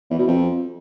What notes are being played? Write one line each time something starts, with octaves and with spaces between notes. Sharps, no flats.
E2
B2
F2